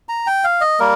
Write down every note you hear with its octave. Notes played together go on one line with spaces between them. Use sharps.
A#5
G5
F5
D#5
G3 A#3 A#4